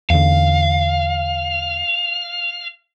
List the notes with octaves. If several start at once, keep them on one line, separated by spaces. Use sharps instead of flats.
E2 D3 F5